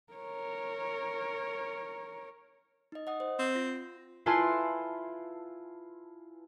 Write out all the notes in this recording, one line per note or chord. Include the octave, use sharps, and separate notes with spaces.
A#4 C#5
D#4 D#5
D#5 F#5 D#6
C5
C4
F4 A#6
E4 F4 B4 G#5 A5 C6